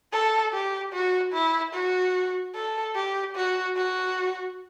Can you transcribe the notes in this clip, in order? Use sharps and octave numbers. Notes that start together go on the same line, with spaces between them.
A4
G4
F#4
E4
F#4
A4
G4
F#4
F#4